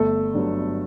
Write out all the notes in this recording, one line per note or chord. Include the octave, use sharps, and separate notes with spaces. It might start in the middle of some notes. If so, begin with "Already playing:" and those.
Already playing: G1 A3 A4
G2 F#3 B3